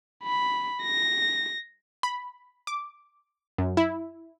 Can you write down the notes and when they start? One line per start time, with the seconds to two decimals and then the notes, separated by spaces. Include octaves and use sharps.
0.24 B5
0.83 A#6
2.03 B5
2.67 D6
3.58 F#2
3.77 E4